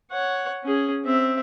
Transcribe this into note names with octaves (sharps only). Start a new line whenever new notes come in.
C#5 F#5
C#4 G#4
C4 E5